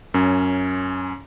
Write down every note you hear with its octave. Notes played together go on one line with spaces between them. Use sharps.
F#2 C#4